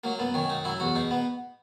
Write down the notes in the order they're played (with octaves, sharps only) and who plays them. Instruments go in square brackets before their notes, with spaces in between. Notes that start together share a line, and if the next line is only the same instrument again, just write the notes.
[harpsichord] F#3 A#3
F#2 B3
D#3 C#4
F#2 D#4
F#3 E4
E2 F#4
B2 D#4
B3